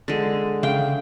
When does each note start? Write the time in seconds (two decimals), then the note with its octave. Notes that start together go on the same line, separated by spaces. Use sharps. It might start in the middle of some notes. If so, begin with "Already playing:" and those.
0.08 D3 G#3
0.63 C#3 E5 F5 G5